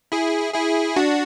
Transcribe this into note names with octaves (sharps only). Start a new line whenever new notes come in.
E4 G#4
E4 G#4
D4 F#4